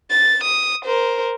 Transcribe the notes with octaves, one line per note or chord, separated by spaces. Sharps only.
A6
D#6
A#4 C5